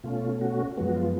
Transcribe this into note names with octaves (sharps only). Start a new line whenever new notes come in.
B2 A3 C#4 F4
F#4
F#2 F3 G#3 B3 F#4
F#4
F4